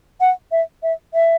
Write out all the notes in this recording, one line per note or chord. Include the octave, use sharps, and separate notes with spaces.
F#5
E5
E5
E5